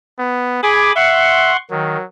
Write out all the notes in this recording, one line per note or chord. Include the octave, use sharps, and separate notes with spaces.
B3
G#4 G#5 B5 D6
E5 F#5 C6 C#6
D#3 F#3